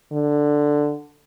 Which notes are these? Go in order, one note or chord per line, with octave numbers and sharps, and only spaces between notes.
D3